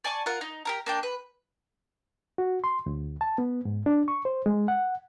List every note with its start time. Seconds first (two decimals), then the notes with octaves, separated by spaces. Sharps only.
0.04 D5 G#5 A5 C#6
0.26 F4 A#4 F#5
0.41 D#4
0.65 G4 A#4 A#5
0.86 A#3 D4 G5
1.03 B4
2.38 F#4
2.64 C6
2.86 D2
3.21 A5
3.38 B3
3.65 G#2
3.86 D4
4.08 C#6
4.25 C5
4.46 G#3
4.68 F#5